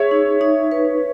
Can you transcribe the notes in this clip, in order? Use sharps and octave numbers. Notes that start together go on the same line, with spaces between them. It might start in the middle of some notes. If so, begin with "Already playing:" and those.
Already playing: G#4 C#5 E5
D#4
D#4
B4